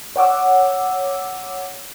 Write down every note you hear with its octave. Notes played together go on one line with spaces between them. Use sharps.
C#5 F#5 D6 E6